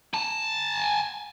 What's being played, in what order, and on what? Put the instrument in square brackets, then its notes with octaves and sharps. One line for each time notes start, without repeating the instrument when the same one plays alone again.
[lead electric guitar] G#5 A5